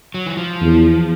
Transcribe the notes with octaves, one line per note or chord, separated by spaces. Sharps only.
F#3
E3
F3
E2